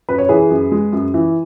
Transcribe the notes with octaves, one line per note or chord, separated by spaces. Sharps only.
F#2 B4
C#5
E3 G#4 B4
F#2
G#3
F#2
E3